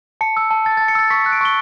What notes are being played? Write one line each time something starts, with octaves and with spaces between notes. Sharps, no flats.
A5 C#7
E6
A5
A5 A6
A6
A5
C#7
E6 A6
C#6 B6
C#7
F#6
D7
C#6 G7